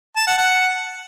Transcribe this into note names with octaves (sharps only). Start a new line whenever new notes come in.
A5
F#5
F#5